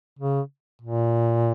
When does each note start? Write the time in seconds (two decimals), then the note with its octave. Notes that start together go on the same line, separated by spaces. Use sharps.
0.19 C#3
0.82 A#2